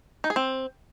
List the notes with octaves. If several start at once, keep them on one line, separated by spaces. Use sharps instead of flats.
D#4
G#4
C4